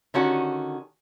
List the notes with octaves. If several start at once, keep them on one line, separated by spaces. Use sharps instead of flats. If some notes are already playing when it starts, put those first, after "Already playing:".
D3 D#3 C#4 F#4